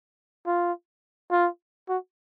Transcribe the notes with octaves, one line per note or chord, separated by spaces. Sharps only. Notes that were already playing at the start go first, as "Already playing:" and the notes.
F4
F4
F#4